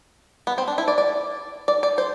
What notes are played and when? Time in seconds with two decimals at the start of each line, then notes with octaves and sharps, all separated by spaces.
0.47 B3
0.58 C4
0.68 D4
0.78 E4
0.88 D5
0.98 D5
1.68 D5
1.83 D5
1.98 C5